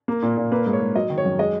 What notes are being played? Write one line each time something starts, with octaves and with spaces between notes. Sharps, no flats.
A#3
A#2
A#2
A#3 B4
G#2
C#5
G#2
F#3 D#5
D#3
C#5
F#2
G#3 D#5